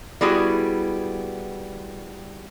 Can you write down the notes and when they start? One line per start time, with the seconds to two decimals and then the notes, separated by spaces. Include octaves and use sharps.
0.21 G3 B3 E4 F#4 G#4